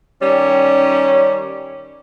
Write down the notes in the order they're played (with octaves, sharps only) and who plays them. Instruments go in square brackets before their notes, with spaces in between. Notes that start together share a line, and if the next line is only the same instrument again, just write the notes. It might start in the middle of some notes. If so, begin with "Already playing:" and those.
[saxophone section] D#3 G3 C#4